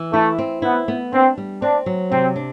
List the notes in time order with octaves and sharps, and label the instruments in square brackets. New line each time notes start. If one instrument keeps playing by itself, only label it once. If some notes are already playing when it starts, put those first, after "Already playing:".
Already playing: [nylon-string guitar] E3
[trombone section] A3 [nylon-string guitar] E4
[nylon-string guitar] C4
[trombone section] B3 [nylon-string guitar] E4
[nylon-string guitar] B3
[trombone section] C4 [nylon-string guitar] D4
[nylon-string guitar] G3
[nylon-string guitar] C4 [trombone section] D4
[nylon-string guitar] F#3
[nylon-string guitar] C3 [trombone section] C4
[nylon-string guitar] D4